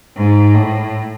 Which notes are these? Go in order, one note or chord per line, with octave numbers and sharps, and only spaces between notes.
G#2
A2